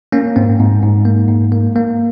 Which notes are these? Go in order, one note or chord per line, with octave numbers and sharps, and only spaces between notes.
A#3 C#4
G#2 C4
G#2
G#2
A#3
G#2
A#3
A#3